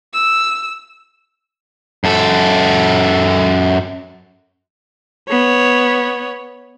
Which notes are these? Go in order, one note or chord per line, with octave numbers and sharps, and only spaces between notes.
E6
F#2 A4
B3 C#5